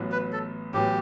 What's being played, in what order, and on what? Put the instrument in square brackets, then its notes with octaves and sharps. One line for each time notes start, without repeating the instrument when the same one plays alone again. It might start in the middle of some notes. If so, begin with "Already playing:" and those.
Already playing: [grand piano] A1 A2 F#3 B3
[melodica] B4
A4
[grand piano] A1 A2 F#3 B3 [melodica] G4